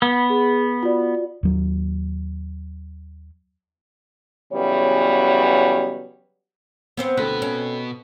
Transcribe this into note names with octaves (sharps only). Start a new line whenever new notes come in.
B3
G#4
F4 F#4 D5
D#2 F#3
C#3 E3 F#3 G3 B3 C#5
B3 C4 C5
D2 B2 C4 A4 B4 F#6
C#4